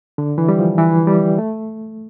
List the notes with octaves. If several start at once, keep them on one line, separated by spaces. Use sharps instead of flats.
D3
E3
G3
F3
E3
G3
A3